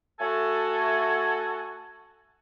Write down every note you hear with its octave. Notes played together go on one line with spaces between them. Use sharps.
A3 F#4 A4 G#5